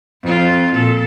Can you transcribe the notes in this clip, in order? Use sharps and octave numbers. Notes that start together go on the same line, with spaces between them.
F2 F4
A#2 A4